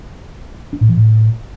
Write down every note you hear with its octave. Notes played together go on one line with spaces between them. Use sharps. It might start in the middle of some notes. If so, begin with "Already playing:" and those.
D4
A2
E3
A2